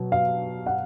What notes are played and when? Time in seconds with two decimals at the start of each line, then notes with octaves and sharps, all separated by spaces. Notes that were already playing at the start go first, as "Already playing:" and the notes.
Already playing: B2 F#3
0.12 F5
0.66 F#5